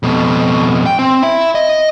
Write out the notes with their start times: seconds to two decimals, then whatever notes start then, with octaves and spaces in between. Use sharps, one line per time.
0.03 F2 B2
0.86 G5
0.99 C4
1.22 E4 E5
1.55 D#5